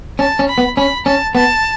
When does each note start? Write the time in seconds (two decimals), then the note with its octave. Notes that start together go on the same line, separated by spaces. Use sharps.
0.19 C#4 A5
0.39 C#4
0.49 B5
0.58 B3
0.77 C#4 B5
1.06 C#4 A5
1.35 B3 A5